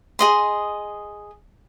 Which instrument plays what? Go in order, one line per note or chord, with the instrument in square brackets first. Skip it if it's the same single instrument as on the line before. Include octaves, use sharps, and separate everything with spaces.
[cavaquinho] G#4 D#5 C6